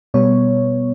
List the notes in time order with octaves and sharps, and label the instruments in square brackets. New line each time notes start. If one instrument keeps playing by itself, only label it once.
[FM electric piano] B2 G3 B3 C#5